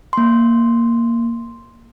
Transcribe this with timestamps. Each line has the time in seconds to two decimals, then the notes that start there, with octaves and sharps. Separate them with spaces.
0.13 A#3 C6